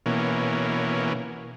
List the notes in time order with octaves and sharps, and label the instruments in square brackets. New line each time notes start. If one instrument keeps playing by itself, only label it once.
[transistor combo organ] B2 E3 A#3 C#4